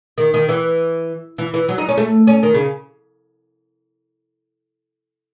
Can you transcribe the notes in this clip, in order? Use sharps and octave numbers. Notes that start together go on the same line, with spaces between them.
D#3
D#3
E3
E3
E3
F#3
D#4
C#4
A3
C#4
D#3
C#3